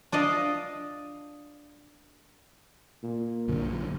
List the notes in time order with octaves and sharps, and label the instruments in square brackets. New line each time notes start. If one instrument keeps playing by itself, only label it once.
[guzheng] D4 D5 D#5 F5 A5
[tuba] A#2
[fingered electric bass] A#1 F#2 D3